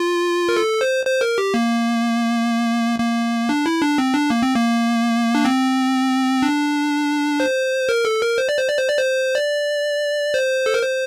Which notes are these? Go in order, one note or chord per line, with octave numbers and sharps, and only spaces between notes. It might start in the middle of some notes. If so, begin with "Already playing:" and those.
Already playing: F4
A#4
A4
C5
C5
A#4
G4
A#3
A#3
D4
E4
D4
C4
D4
A#3
C4
A#3
D4
C4
D4
C5
A#4
A4
A#4
C5
D5
C5
D5
C5
D5
C5
D5
C5
A4
A#4
C5